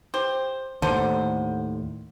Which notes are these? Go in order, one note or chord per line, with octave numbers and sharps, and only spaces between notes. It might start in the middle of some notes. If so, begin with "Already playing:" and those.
G4 C5
D#2 A2 D3 C5